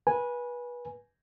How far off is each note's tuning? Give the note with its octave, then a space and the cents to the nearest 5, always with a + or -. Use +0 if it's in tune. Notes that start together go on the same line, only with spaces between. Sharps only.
B4 -25 G#5 +0